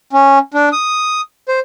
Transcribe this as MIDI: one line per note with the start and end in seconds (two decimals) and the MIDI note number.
0.13 0.39 61
0.54 0.69 62
0.73 1.21 87
1.48 1.60 72